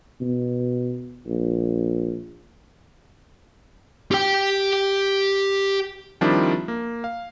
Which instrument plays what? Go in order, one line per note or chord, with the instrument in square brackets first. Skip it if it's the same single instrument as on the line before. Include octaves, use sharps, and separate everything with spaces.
[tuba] B2
A#1
[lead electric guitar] G4 G5
[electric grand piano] D#3 F3 G3 C4 D4 E4
A#3
F5